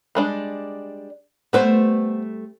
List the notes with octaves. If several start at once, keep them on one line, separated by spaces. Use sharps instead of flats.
G3 G#3 D4
G3 A3 B3 C4 B4 C5